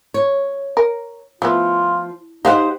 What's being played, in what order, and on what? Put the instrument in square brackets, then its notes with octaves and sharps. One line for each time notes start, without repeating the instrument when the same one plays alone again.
[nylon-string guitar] C#5
[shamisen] A#4
[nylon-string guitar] F3 [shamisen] A3 B3 [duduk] F4
[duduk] D#4 [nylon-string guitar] G4 C5 F#5 [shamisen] D#5 F5